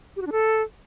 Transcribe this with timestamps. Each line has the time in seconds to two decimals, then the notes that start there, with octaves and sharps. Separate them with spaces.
0.16 G4
0.22 F#4
0.27 D4
0.32 A4